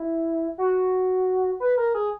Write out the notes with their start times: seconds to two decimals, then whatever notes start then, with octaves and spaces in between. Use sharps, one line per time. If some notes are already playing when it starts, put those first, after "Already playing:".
Already playing: E4
0.58 F#4
1.60 B4
1.78 A#4
1.95 G#4